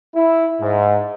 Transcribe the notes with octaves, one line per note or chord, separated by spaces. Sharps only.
E4
G#2